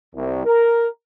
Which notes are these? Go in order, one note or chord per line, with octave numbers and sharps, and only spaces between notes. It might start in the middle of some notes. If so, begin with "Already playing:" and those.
C2
A#4